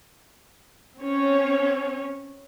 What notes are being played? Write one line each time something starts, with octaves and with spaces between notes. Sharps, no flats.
C4 C#4 C#5